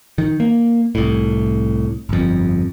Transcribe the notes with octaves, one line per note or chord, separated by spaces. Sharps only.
D#3
A#3
C2 A2
G1 F2